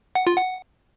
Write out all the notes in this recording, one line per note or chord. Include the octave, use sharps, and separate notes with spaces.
F#5
F4
F#5